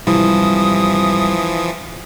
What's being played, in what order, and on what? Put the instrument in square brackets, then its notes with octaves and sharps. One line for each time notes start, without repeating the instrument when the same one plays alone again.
[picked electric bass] G#1 C3 G3 [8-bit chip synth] E3 F3 [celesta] E4 [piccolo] D#6